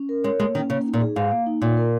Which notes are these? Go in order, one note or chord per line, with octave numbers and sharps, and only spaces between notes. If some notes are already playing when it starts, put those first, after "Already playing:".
Already playing: C#4
A#4
G#3 C#5
G#3 A#3
D#3 C#4
C#3 A#3
D#4
A#2
G#4
G#2 F5
A#3
D#4
A#2 F4
A#4